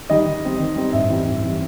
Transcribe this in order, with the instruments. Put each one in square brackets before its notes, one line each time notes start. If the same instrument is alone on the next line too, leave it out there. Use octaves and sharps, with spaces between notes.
[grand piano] D#3 G3 D#4 D#5
D#3
G3 C4 D#4
D#3
G3 C4 D#4
G2 E5
E3 G3 C4 D#4
G2
E3 G3 C4 D#4